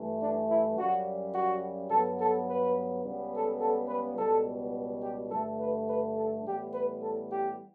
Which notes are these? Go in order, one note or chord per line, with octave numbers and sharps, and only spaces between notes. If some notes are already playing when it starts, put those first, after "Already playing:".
Already playing: G2 E3 A3
D4
E4
F#2 C#3 G3 F#4
F#4
G2 F#3 B3 A4
A4
B4
C#2 C#3 G3 B3
A4
A4
B4
C#2 B2 G3 B3 A4
G4
G2 D3 A3 A4
B4
B4
A4
A2 E3 G3 B3 G4
B4
A4
G4